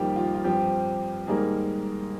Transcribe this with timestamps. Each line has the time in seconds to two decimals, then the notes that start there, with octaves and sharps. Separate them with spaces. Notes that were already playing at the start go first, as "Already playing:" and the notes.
Already playing: F2 D#3 G3 A#3 F4 G4
0.16 F4
0.34 F4
0.44 G2 F3 C4 G4
1.27 G#2 D#3 G3 A#3 G#4